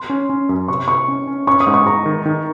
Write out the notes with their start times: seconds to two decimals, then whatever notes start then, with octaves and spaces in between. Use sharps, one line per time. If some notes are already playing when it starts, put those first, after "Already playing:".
Already playing: C6
0.10 C#4
0.29 C#4
0.49 F#2
0.68 C3 C#6
0.88 C3 C#6
1.08 C#4
1.27 C#4
1.47 C#4 C#6
1.60 D#6
1.67 G#2
1.74 C#6
1.86 G#2 A#5
2.06 D#3
2.26 D#3